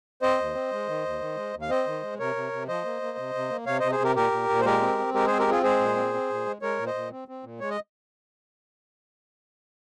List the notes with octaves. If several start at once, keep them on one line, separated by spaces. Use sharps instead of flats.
C4 C5 D#5
D#2
C4
G#3
D#3
D#2
D#3
G#3
D#2
F5
C4 C5 D#5
D#3
G#3
C3 A#4 C#5
C3
C3
F3 C5 D#5
A#3
A#3
C3
C3
A#3
C3 C#5 F5
C3 C5 D#5
G#4 C5
C3 G4 A#4
A#2 G4 A#4
A#2
A#2
C5
G#3 G4 A#4
C4
C4
G#3 G4 A#4
C4 G#4 C5
G4 A#4
C4 F4 G#4
G#3 G#4 C5
A#2
C4
C4
A#2
G#3
G#3 A#4 C#5
A#2
C5 D#5
A#2
C4
C4
A#2
G#3 C#5
D#5